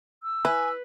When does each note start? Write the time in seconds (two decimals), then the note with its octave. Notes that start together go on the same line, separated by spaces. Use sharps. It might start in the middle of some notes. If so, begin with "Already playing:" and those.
0.23 E6
0.45 E4 B4 G#5